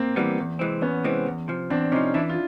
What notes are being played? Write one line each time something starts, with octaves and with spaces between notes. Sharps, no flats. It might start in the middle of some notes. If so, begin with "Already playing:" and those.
Already playing: A#3 C4
E3 G3 B3
E2
C3 E3 G#3 C4
E2 B3 C#4
C3 E3 G#3 C4
E2
C3 F3
E2 C4 D4
C3 F3 C#4 D#4
E3 D4 E4
F4